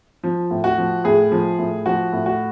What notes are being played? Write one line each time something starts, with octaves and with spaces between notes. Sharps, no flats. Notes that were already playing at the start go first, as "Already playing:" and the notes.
F3
A2
F#4
F3
A2 G#4
F3
A2
F3 F#4
A2
F#4